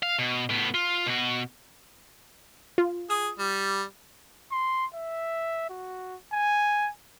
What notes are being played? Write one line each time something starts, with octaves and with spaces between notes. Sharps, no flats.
F5
B2
A2 B3
F4
B2 F#4
F4
G#4 D#6
G3
C6
E5
F#4
G#5